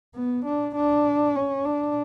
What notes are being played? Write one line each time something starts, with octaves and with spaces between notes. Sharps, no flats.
B3
D4
D4
C#4
D4